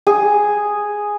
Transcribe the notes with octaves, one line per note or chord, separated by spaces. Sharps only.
G#4